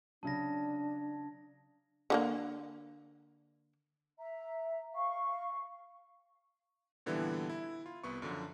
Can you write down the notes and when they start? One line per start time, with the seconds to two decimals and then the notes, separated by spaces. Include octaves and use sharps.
0.23 C#3 F#3 D4 A5 A#6
2.10 D3 F#3 A#3
4.18 E5 A#5
4.94 F5 C#6
7.06 A#2 D3 E3 G3 B3 E4
7.49 E4
7.86 F4
8.04 C2 B3 C#6
8.22 F#2 D3 F3